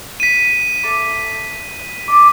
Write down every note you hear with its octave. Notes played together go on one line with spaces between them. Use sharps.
B6 D#7
A4 E5 D6
D4 D6